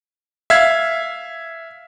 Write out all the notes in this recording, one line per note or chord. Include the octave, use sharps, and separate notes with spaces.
E5 F5 G#6